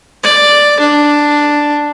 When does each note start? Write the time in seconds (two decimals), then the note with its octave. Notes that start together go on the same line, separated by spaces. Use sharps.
0.23 D5
0.80 D4